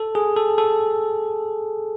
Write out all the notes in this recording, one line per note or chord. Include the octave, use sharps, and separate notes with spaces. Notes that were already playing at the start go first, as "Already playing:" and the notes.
Already playing: A4
G#4
A4
A4